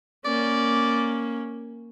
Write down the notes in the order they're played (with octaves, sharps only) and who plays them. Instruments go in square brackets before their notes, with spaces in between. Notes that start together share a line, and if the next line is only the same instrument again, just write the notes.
[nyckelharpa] A#3 C#4 [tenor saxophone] D5